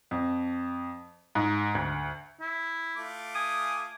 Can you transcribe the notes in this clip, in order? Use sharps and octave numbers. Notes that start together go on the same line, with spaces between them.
F2
G#2
D2
E4
A3 F4 D6
G#5 D#6